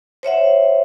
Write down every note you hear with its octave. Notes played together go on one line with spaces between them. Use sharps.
C5 C#5 E5 F#5